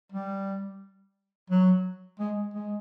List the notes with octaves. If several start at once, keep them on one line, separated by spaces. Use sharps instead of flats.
G3
F#3
G#3
G#3